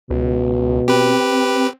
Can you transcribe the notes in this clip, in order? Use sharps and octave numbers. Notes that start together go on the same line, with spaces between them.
C#2 B2
C4 G4 B4